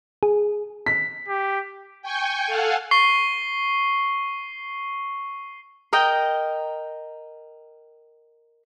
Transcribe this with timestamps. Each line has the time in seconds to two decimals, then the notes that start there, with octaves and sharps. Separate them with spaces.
0.23 G#4
0.86 B6
1.28 G4
2.02 G5 G#5 C#6 G6
2.47 A4 F5 F#5 G#5
2.91 C#6 C7 G7
5.93 A#4 D#5 G5